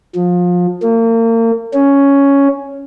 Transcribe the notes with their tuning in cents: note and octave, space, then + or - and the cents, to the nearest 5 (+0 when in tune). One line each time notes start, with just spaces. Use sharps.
F3 +25
A#3 -35
C#4 +5